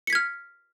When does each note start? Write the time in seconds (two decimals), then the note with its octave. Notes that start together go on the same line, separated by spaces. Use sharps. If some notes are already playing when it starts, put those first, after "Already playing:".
0.07 C#7
0.10 B6
0.13 G#6
0.15 F6